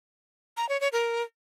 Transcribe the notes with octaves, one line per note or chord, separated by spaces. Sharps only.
A#5
C#5
C#5
A#4